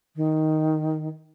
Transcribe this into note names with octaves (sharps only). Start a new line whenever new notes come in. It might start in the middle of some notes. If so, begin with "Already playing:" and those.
D#3